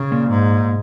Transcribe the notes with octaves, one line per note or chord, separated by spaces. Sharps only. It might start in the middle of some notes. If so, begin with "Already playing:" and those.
Already playing: C#3
A#2
G#2